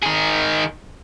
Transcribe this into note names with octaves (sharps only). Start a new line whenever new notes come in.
D#3 G#4